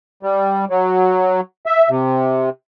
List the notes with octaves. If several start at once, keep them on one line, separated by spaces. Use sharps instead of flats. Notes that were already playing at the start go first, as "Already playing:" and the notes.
G3
F#3
E5
C3